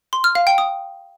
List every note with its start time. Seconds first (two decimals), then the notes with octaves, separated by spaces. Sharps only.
0.13 C6
0.24 F6
0.35 F5
0.47 G5
0.58 D#6